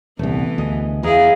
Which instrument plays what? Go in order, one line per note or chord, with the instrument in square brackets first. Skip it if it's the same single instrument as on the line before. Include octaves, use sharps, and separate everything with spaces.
[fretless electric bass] D#1 C2 [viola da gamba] E3 B3 [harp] A3
[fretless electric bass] D2 [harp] G#4 D#5 G#5
[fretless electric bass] E2 [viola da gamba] B3 E4 G#4 [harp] D#5 F5 A#5